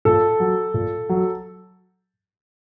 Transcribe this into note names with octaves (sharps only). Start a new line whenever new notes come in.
A#2 A4
F#3
A#2
F#3